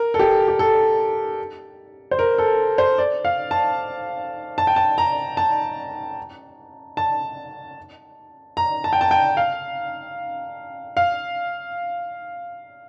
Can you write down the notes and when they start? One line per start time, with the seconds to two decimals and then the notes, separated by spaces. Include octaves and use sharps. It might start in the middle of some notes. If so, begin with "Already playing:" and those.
Already playing: A#4
0.14 A4
0.19 G4
0.48 G4
0.59 A4
2.11 C5
2.19 A#4
2.38 A4
2.78 C5
2.98 D5
3.25 F5
3.51 A5
4.58 A5
4.67 G5
4.76 A5
4.98 A#5
5.37 A5
6.97 A5
8.57 A#5
8.84 A5
8.93 G5
9.01 A5
9.11 G5
9.37 F5
10.97 F5